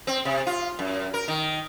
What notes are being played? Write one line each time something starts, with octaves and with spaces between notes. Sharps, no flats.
C4
C3
F4
F#2
A#4
D#3